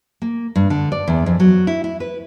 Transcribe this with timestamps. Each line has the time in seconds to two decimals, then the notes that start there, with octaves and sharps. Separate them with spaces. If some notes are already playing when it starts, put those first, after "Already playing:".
0.22 A#3
0.56 G2
0.70 D3
0.92 D5
1.08 E2
1.26 F2
1.40 F#3
1.67 E4
1.84 E4
2.00 B4